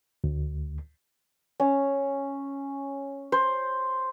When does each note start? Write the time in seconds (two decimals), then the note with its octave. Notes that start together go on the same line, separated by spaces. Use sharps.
0.24 D2
1.60 C#4
3.32 C5